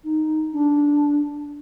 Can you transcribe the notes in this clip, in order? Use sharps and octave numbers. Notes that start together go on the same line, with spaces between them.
D#4
D4